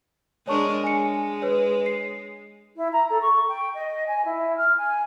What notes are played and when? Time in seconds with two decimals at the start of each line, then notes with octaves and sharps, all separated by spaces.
0.48 G#3 D4 A#4 C#5 A5 C#6
0.84 G#3 G#5 C#7
1.42 B4 C#5
1.86 C7
2.76 E4
2.92 A#5
3.10 A4
3.21 C#6
3.48 G5
3.74 D#5
4.06 G#5
4.24 E4
4.57 F6
4.77 G#5